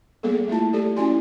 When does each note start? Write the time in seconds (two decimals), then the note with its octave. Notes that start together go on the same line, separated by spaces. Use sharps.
0.23 G3 A#3 B3 G#4 A4
0.48 A3 E4 F4 A5
0.73 G4 A4 D5
0.97 C#4 E4 F#4 D5 G#5 C6